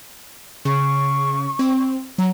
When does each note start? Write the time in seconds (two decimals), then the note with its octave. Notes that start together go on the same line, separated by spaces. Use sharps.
0.65 C#3 C#6
1.59 C4
2.18 F#3 A#5